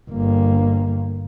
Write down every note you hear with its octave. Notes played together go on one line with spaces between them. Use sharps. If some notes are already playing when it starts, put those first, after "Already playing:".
G1 A#3